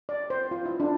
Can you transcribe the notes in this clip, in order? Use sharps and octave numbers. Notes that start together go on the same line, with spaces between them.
D5
C5
F4
E4
D4